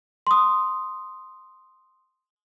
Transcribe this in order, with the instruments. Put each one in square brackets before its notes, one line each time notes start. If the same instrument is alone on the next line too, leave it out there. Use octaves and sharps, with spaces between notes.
[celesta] C6 D#6